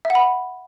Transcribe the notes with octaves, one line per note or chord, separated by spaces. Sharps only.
E5
F#5
B5